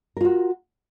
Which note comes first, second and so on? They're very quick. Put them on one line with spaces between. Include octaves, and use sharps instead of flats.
A#4 F4 F#4